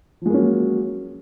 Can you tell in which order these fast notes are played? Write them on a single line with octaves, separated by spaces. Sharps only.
F3 G#3 A#3 C#4 F#3